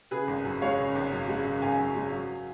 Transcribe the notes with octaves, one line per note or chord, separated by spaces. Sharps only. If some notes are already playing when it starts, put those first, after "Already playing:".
C#3 G#4 B4
G#1
F#2
G#3 C#5 F5
C#3
G#1
F#2
G#3
C#3
G#1 F5 G#5
F#2
G#3
F#3